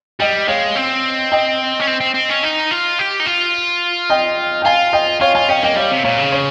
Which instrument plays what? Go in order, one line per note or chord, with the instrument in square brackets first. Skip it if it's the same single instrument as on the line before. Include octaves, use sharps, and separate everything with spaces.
[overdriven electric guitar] G3 [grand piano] D#5 G5
[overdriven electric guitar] G#3 [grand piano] C#5 F5
[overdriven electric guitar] C4
[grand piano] D#5 G5
[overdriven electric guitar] C#4
C4
C4
C4
C#4
D#4
F4
G4
D#4
F4
[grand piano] D#5 G5
G5
[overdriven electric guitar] F4 [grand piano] F5 G#5
[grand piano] D#5 G5
[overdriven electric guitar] F4 [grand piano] C#5 F5
[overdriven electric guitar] F4 [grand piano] F5 G#5
[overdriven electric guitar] C#4 [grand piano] D#5 G5
[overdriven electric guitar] A#3 [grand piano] D#5 G5
[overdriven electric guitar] G3 [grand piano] C#5 F5
[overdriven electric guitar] C3
[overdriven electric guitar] A#2 [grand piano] C#5 F5
[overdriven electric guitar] C#3
[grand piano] C#5